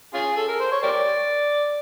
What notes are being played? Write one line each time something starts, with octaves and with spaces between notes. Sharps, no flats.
C#4 F4 G#4
A4
A#4
C5
C#5
G4 A#4 D5